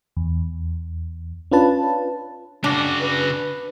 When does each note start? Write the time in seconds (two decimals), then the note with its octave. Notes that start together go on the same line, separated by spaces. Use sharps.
0.17 E2
1.51 C#4 D4 F4 B4 A5
2.64 C#3 D4 F#4
3.00 B4